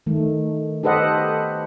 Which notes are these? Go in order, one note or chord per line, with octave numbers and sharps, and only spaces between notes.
D#3 A3
G4 A4 B4 C5 D#5 F#5